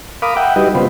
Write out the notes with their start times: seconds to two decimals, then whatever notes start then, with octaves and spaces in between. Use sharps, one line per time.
0.22 A#4 F5 B5 D6 D#6
0.37 E5 F#5 G5
0.56 G3 D#4 F#4 G4 B4 D#5
0.75 C#3 G3 B3 F4 B4 C5